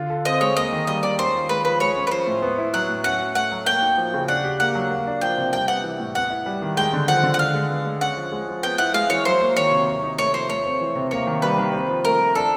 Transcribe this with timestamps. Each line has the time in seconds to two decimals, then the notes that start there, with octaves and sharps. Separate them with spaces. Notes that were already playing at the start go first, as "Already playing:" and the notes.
Already playing: D3 F4
0.09 A4
0.25 C4 D#5
0.41 G#3 C#5
0.57 A#3 D#5
0.72 D#3
0.87 G3 D#5
1.03 D#3 D5
1.19 C#4 C5
1.34 F4
1.49 G#3 B4
1.65 F3 B4
1.80 G#3 C#5
1.97 C#4
2.07 B4
2.11 F3 C5
2.27 A2
2.42 B3
2.58 E4
2.74 F#3 F#5
2.89 A2
3.04 C#4 F#5
3.20 F#4
3.35 A3 F#5
3.51 F#3
3.66 A#3 G5
3.82 D#4
3.97 F3
4.14 C#3
4.28 D4 F#5
4.44 G4
4.60 A#3 F#5
4.75 F#3
4.90 A#3
5.07 D4
5.21 F3 G5
5.37 C3
5.53 G3 G5
5.68 B3 F#5
5.83 E3
5.99 A2
6.15 B3 F#5
6.30 E4
6.46 G3
6.62 D#3
6.77 G#3 G5
6.93 D3
7.08 F3 F#5
7.23 D3
7.34 F#5
7.39 D4 F5
7.54 G#3
7.70 B3
7.85 G#3
8.01 C#4 F#5
8.17 F3
8.32 G#3
8.48 F3
8.63 B3 G5
8.78 E4 F#5
8.94 G#3 F5
9.10 E3 C#5
9.25 F#3 C5
9.41 A#3
9.57 D#3 C#5
9.71 C3
9.87 C4
10.03 D#4
10.19 A3 C#5
10.33 F3 C5
10.49 A3 C#5
10.65 C4
10.80 E3
10.95 C3
11.11 A#3 C#5
11.27 D#3
11.42 G3 B4
11.58 D#3
11.74 C4
11.89 F3
12.05 A3 A#4
12.20 F3
12.35 D4 A4